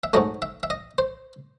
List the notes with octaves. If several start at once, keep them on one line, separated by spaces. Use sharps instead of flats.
E5
G#2 F#3 A3 D#5
E5
E5
D#5
C5